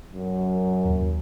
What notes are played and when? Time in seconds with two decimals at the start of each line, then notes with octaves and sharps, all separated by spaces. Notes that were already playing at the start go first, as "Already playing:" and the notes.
0.13 F#2
0.85 D#2